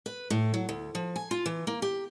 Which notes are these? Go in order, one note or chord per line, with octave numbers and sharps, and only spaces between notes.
B4
A2
F#3
D2
F3
G#5
F4
E3
A#3
G4